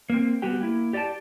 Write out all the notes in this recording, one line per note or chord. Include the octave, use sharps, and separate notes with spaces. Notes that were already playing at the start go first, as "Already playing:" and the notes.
A#3 C4
G3 B3 F#4 G4 G5
A#3 E4
G4 D5 D#5 G5 A5